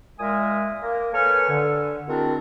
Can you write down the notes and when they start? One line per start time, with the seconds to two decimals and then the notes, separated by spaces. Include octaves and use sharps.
0.19 A#2 G#3 A#4 E5 G#5 D#6
0.82 A#3 A#4
1.13 A4 B4 C#5 G#5 C#6 F6
1.48 D3
2.08 G#3 C4 D4 E4 F#4 A#4